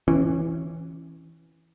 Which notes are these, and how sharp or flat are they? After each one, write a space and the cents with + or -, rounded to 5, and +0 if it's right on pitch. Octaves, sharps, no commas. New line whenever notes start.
E3 +0 C#4 -20